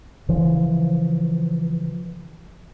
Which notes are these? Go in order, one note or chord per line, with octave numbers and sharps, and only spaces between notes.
C#3 E3 F3